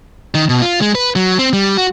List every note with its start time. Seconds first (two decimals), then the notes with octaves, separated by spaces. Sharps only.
0.35 D#3
0.49 B2
0.62 F4
0.81 G#3
0.95 B4
1.16 F#3
1.39 C4
1.53 G3
1.77 F#4